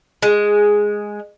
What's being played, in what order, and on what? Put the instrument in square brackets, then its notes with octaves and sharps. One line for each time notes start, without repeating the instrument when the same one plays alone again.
[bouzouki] G#3